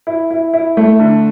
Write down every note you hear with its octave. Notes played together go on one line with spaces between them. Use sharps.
E4
E4
E4
A3
D3